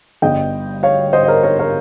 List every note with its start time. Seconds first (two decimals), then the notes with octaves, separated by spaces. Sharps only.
0.22 G1 G2 G3 D#5 G5
0.83 C#5 F5
1.13 C5 D#5
1.23 D#5
1.28 A#4 C#5
1.43 A#4 C#5
1.59 A#4 C#5